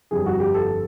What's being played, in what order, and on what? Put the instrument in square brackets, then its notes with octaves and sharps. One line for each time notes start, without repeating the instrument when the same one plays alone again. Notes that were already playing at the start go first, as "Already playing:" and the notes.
[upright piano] G1 F2 D3 G3 G#4
F#4
G4
A4